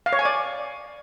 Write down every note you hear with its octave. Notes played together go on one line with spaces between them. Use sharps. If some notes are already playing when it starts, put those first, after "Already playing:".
F5
C#5
G#5
D5